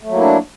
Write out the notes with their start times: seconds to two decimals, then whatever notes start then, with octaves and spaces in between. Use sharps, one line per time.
0.03 A3
0.07 F#3
0.12 A#3
0.16 E4
0.21 D4